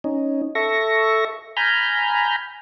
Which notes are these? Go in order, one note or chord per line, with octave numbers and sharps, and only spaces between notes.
C#4 D#4
A4 E5 C#6 A#6
G#5 A#5 B5 F6 G6